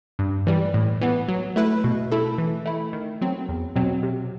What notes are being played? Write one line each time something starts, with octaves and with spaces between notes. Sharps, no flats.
G2
E3 G3
A2
E3 B3
F#3
A3 E4 B4
B2
A3 E4 A4
E3
A3 E4
D#3
F#3 C4
E2
B2 F#3 C4
C3